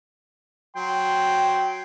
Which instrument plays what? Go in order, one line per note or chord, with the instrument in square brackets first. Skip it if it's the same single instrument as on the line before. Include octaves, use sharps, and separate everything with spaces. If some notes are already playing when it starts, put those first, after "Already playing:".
[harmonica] F#3 C6 [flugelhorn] G5